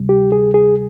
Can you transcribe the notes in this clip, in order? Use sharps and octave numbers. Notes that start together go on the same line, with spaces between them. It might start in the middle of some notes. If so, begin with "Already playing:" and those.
Already playing: D2 C3 G3
G4
G#4
G#4